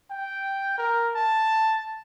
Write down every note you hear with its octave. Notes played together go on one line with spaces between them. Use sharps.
G5
A#4
A5